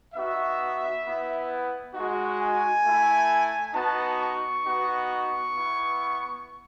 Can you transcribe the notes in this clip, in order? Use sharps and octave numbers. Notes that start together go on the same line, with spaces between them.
B3 D#4 F#4 E5
B3 E4
G#3 D#4 F#4
G#5
A3 E4
B3 D#4 F#4 A5
C#6
B3 D#4 F#4
C#6
B3 E4